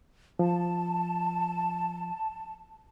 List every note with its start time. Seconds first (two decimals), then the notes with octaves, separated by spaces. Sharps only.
0.39 F3 A5